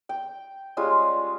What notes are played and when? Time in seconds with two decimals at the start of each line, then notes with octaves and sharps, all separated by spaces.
0.09 G5
0.77 G3 G#3 C#4 F4